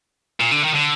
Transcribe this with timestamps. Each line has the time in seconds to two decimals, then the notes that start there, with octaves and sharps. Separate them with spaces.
0.40 A#2
0.51 D3
0.62 D#3
0.74 D3